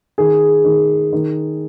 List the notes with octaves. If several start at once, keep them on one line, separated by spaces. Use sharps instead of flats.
D#3 G#4
D#3
D#3